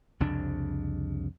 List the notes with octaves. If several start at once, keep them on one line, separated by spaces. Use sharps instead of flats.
C2 F2 C#3 D4